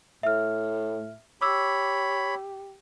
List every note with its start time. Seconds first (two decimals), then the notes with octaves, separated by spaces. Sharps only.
0.23 A2 E5 F6
1.41 G4 C#5 B5 D6 E6